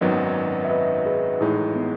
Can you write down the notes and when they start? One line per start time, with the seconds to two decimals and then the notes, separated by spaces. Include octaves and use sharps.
0.01 G#1 F#2 D#3 F#3 B3 B4 D#5
0.65 E5
0.71 B4 D#5
1.06 G#4 B4
1.40 A1 A2 G#3 D#4 E4 G#4
1.76 B3